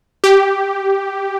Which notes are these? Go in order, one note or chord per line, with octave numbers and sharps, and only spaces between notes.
G4